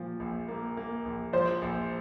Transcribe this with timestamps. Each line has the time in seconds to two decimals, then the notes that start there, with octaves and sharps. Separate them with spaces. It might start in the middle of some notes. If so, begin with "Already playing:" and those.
Already playing: A#2 F3
0.20 A#1
0.48 A#3
0.77 A#3
1.05 A#1
1.33 F3 C5
1.62 A#1